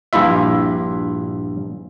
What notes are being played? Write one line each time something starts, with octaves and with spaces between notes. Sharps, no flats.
A#1 G2 E4 F4 E5